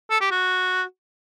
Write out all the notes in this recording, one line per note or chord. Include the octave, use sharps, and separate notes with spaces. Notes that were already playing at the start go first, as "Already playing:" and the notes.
A4
G4
F#4